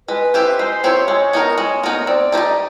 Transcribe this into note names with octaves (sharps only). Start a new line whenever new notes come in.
G#3 B4
C4 E4 G4 C5
G#3 C5
C4 E4 G4 C5 C#5
G#3 C#5
B3 D#4 F#4 A#4
G#3
B3 D#4 F#4 A#4
C4 D5
D#4 G4 C5
D#5